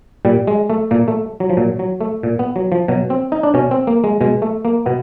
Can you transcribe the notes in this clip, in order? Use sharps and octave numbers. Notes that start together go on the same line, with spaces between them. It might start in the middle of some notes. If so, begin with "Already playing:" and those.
A#2 G3
G#3
A3
A#2 A#3
A3
F#3
F3
A#2 F#3
F#3
A3
A#2
B3
F#3
F3
B2 F#3
C4
D#4
D4
B2 C#4
C4
A#3
G#3
B2 G#3
A3
A#3
B2 B3